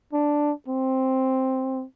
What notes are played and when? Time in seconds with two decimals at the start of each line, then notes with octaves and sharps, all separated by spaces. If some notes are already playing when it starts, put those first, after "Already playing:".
0.13 D4
0.68 C4